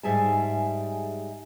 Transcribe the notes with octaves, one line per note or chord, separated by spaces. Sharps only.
G#2 G3 G#4 E5 G#5 A5